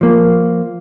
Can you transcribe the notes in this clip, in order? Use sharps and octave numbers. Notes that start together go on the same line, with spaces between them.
F3 A#3